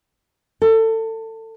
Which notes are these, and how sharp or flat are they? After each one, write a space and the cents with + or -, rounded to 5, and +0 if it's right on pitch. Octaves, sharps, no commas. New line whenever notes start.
A4 +25